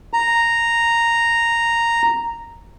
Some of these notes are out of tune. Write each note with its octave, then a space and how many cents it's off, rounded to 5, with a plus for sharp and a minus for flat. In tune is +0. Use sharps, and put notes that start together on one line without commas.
A#5 -5